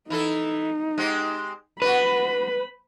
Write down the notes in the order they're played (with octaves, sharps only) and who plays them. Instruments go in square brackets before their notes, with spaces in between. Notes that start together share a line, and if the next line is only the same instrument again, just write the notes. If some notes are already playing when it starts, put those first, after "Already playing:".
[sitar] E3 E4 A4 [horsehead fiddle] D#4
[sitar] G#3 C4 G4
[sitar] D4 F#4 [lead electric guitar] B4 [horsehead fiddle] B5